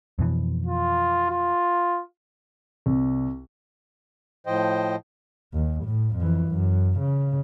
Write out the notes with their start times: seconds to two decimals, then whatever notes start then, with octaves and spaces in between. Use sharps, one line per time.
0.19 F2 B2 E3
0.66 F4
1.30 F4
2.86 C2
4.47 A2 F3 C5 D#5 G5
5.54 D#2
5.85 A2
6.16 F2 E3
6.47 F#2
6.99 C#3